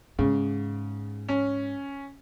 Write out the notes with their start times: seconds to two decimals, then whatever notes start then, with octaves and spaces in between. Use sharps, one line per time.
0.19 G#2 C#3
1.29 C#4